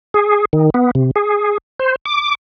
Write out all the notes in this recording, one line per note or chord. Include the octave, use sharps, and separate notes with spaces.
G#4
D#3
B3
C3
G#4
C5
D6